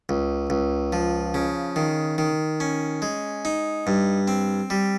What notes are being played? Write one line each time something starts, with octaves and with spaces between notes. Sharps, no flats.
C#2
C#2
F3
C#3
D#3
D#3
C#4
G#3
D#4
G2
C4
G3